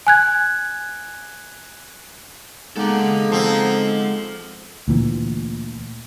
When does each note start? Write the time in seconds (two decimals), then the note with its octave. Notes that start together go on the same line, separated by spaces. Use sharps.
0.07 G#5 F#6 G#6
2.77 G#3 A#3 B3 D#4 A4 F#5
3.32 F3 C4
4.88 D2 A#2 E3